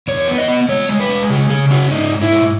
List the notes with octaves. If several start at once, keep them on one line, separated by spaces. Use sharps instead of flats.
E2 C#5
B3
D#5
B3
G#3 C#5
G#3
B4
G#3
C#3 G#4
C#3 G#4
C#4 F#4
G#2 D#4
G#2
E4
G#2